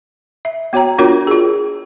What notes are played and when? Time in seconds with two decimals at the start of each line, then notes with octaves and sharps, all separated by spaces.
0.45 E5
0.73 B3 F#4 C#5 G5 A#5
0.98 B3 D4 F4 F#4 A#4 C#5
1.27 F4 G#4